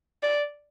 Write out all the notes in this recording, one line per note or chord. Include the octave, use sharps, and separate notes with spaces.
D5